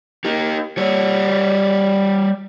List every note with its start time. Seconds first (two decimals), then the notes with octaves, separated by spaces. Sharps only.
0.25 D#4 G4
0.78 G3 C#5